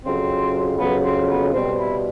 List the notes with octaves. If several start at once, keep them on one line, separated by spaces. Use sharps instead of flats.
F2 C#3 F#3 C4
F2 C#3 F#3 B3
C4
B3
B2 G3 C4
E4